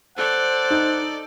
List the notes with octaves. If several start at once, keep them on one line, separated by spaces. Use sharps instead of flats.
A4 C5 D5 F#5
D#4